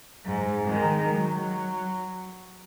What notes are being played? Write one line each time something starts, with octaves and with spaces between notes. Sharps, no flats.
G#2
D#3 G#3
F#3